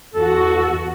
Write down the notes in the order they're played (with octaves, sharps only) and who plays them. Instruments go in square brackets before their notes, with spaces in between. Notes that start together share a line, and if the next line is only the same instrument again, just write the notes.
[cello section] E2 F#4 [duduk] A4